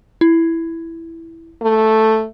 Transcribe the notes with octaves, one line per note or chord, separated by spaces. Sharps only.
E4
A3